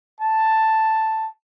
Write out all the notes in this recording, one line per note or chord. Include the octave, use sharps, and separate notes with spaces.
A5